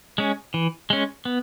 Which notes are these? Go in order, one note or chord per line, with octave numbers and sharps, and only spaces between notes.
G#3 C#4
E3
G#3 C#4
B3